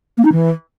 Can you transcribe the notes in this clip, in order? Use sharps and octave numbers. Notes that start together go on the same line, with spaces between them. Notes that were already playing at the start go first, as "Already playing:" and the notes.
A#3
D#4
E3